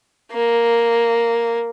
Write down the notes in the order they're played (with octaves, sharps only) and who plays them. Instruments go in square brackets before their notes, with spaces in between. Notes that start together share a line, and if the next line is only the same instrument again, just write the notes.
[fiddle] A#3